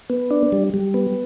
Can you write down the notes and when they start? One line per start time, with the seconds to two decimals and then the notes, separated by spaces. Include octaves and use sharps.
0.10 B3
0.31 D4
0.52 G3
0.74 G3
0.94 B3